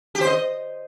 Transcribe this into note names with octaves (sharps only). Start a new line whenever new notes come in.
G4
C5
D#5